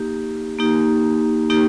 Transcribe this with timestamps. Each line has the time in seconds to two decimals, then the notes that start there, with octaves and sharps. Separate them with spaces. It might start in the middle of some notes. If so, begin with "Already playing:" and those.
Already playing: A#3 D#4 G4
0.59 A#3 D#4 G4
1.50 A#3 D#4 G4